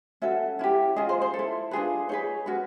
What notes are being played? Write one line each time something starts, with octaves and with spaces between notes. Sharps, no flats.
C#4 F#4 A4 E5
C#4 E4 G4
C#4 F4 G#4 D#5
C5
C5
A4
E4
D4 F4 G#4 B4
D#4 G#4 B4 C#5
C#4 F#4 B4